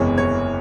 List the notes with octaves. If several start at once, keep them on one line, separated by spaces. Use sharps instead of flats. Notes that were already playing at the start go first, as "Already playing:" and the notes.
Already playing: F#1 E2 C3 E3 G#3 C#5
C#5